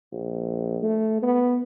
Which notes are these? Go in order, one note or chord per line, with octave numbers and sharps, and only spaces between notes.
A#1
A3
B3